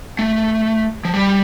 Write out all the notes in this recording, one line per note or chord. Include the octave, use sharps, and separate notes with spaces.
A3
F3
G3